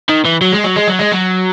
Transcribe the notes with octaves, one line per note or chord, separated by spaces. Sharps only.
D#3
E3
F#3
G#3
F#3
G#3
F#3
G#3
F#3